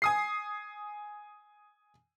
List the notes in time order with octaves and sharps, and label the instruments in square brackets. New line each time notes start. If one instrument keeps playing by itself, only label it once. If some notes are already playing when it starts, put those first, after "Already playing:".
[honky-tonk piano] G#5 D#6 C7